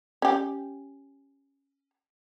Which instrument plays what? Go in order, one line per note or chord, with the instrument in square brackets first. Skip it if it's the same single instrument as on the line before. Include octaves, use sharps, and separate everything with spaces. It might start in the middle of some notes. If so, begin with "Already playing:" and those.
[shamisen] C#4 G4